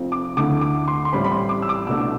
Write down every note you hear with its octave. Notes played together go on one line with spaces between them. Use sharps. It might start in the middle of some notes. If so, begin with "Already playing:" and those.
Already playing: F1 F2 C3 F3 C4
D6
D2 D3 A3 E4 D6
D6
C6
C6
A1 A2 G3 C4 B5
B5
C6
D6
E6
D6
C2 B2 A3 D4 E6